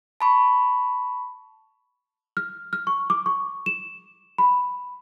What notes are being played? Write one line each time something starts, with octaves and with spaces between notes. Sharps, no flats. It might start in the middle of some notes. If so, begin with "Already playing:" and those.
A5 B5 C#6
F6
F6
C#6
D6
C#6
E7
B5